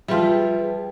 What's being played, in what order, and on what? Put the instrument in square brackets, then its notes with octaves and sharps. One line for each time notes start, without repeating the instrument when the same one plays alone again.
[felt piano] F3 E5 [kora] G3 F4 [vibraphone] G#4 B4 G5